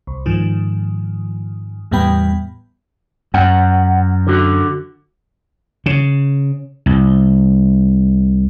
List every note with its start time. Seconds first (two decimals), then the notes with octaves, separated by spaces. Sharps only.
0.07 C2
0.26 G#2 D#3 F3
1.91 E2 A2 G3 B3 G5 B5
3.34 F#2 F#5
4.27 D3 F#4
5.86 C#3
6.86 C2